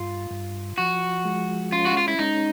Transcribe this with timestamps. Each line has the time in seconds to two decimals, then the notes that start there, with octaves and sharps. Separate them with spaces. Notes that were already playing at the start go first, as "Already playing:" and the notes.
Already playing: G2 F4
0.31 G2
0.78 F3 F#4
1.25 G#3
1.72 C#4 F4
1.85 F#4
1.97 F4
2.08 E4
2.19 G#3 D#4